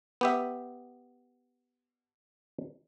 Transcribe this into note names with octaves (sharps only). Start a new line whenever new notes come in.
B3 G4 E5